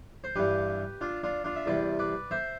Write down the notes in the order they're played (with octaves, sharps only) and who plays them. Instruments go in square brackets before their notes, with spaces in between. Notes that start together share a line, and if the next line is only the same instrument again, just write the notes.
[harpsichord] C5
G2 E3 G3 G4 B4
D4 F4
D4 F4
D4 F4
E5
E2 C3 G3 B4 D5
B4 D5
C5 E5